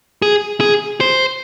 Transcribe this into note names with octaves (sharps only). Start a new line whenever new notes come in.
G#4
G#4
C5